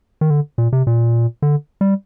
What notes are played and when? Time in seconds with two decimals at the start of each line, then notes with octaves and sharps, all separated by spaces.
0.21 D#3
0.30 D3
0.58 A#2
0.73 C3
0.87 A#2
1.42 D3
1.81 G3